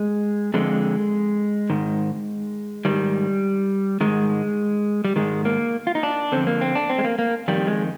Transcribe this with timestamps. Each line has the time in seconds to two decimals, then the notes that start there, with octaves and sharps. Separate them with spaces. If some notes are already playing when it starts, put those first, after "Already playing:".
Already playing: G#3
0.54 F2 D3 G#3
1.70 G#2 D#3
2.85 G#2 D#3 G3
4.01 G#2 D#3 G#3
5.05 G3
5.16 G#2 D#3 G#3
5.45 A#3
5.87 F4
5.95 D#4
6.03 D4
6.32 F2 D3 C4
6.47 A#3
6.61 C4
6.75 D4
6.90 C4
6.98 G#3
7.04 A#3
7.19 A#3
7.48 F2 D#3 G3
7.67 G#3